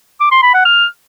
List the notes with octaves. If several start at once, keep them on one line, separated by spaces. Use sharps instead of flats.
D6
C6
B5
F#5
F6